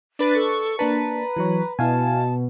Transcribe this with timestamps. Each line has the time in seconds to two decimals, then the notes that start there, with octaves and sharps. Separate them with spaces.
0.19 D4 B4 A6
0.35 A4 C#6
0.79 A#3 D4 B4 A5 A#5
1.36 E3 F#3 C#5
1.79 B2 E4 F5 G#5 A5